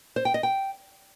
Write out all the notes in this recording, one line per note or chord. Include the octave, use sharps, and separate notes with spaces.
C5
G5
D#5
G5